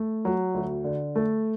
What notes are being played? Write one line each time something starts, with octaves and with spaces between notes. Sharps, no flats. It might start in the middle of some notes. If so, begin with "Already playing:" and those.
Already playing: A3
F#3
D2
D3
A3